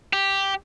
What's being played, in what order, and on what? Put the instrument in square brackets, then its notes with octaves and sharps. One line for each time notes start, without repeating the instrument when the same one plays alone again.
[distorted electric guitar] G4